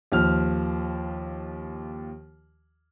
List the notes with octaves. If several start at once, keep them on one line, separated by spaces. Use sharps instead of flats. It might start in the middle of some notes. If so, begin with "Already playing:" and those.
D#2 F3 F6